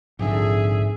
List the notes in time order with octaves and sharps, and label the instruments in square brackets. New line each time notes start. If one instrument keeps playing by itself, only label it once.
[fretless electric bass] A#1 F2 D3 [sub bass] G#2 [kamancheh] G#4 E5